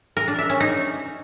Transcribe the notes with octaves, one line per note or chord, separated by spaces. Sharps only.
A#4
D4
E5
C#4
D#4